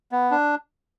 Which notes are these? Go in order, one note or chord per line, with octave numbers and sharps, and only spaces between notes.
B3
D4